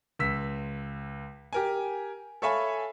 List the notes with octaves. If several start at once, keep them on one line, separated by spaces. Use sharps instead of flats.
C#2 E6 B6
G4 A#4 G#5
A4 C#5 E5 F5 G#5 B5